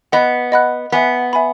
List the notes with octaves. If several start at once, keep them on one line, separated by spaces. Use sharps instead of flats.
B3 D#5 F#5 B5 F#6
D#5 F#5 B5 F#6
B3 E5 G#5 B5
E5 G#5 B5